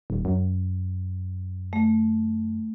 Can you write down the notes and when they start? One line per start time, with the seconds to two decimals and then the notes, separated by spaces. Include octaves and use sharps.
0.10 D#1
0.25 F#2
1.73 A3